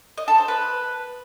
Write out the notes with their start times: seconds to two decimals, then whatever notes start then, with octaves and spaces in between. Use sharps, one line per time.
0.18 D#5
0.28 A4
0.38 C5
0.48 B4